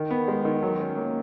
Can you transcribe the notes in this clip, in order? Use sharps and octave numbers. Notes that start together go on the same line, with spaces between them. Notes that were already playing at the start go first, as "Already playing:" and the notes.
Already playing: D#3
B3
G#3
D#3
F#3
C#4
A#3